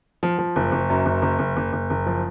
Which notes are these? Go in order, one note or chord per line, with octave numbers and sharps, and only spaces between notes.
F3
F3
F#1
F#1
F#2
F#1
F#1
F#1
F#1
F#1
F#1
F3